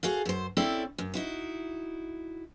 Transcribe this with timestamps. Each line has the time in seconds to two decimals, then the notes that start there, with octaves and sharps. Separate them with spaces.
0.03 F#4 G#4 A4 F5
0.25 F#2 C5
0.57 C4 C#4 E4 A4 D5
0.98 F#2
1.14 D#4 E4 F#4